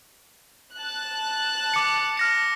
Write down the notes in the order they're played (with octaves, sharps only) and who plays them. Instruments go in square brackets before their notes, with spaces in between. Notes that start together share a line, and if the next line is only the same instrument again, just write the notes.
[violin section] A5 F#6
[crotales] D6 C#7
F6 A#6 C#7